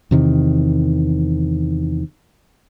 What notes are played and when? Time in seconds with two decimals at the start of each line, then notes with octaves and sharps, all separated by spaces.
0.11 E2 C3 D#3